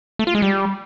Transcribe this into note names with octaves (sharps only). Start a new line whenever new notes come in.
A3
F4
G#3
G3